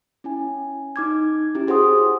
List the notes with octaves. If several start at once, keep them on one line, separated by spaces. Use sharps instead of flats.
C#4 E4 G#5
D#4 D6 G#6
C#4 E4 G4
F#4 G#4 C5 F#5 C6 D#6